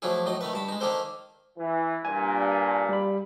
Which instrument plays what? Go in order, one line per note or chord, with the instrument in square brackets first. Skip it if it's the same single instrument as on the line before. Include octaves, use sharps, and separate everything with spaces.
[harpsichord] F3 F#3 A3 D4 E4 G#4
A2 F#3 D#4 D#5
D#3 A3 B4
G2 A5 B5
G#3 D#4
D#3 A#3 D4 G4 A4 C5
[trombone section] E3
[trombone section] G2 A#2 [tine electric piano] G#5
[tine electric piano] G#5
G3 B5